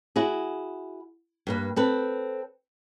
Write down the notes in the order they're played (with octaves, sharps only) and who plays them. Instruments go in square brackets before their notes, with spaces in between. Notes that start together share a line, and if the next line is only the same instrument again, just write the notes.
[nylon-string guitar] E4 F#4 G#4
G2 A#3 B4
C4 A4 B4